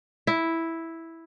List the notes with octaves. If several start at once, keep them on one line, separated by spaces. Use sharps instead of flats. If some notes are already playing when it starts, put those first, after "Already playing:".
E4